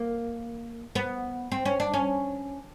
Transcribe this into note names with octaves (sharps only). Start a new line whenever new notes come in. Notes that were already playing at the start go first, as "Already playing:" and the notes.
Already playing: A#3
B3
C4
C#4
D4
C#4